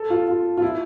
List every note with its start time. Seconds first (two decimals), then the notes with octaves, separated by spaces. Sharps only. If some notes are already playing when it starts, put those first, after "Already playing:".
Already playing: A4
0.10 F4
0.28 F4
0.58 F4
0.62 E4